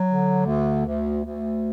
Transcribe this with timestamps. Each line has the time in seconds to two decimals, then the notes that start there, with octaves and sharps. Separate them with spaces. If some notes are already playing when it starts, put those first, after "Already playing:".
Already playing: F#3
0.09 D3
0.47 D2
0.86 D2
1.25 D2